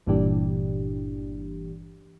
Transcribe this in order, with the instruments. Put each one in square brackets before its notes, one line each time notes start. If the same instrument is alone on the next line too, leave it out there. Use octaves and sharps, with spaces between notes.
[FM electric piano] G1 G2 A#2 E3 D4 G4